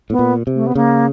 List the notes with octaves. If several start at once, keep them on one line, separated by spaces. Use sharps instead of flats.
A2 B3
A#2
C3
A3
B3
C#3 A#3